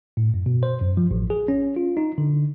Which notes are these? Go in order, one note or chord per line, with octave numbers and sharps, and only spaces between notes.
A2
F#2
B2
C5
F#2
F3
A1
G#4
C#4
F4
D#4
D3